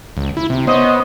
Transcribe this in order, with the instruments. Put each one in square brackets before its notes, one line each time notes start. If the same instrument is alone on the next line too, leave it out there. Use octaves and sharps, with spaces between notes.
[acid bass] C#2
E4
C3
[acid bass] B3 [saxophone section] C5 C#5 D#5